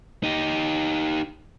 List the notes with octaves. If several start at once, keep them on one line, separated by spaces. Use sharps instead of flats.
D#4 G4